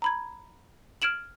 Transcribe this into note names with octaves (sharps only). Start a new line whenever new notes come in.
A#5 B5 G#6
F6 G#6 D7 E7 F#7